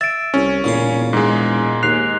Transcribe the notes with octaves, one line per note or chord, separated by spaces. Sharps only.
E5 A6 D7
C2 C#4
E1 A#2 C#3 C6
E1
G#2 G#3
D#2 F#6 C7 F7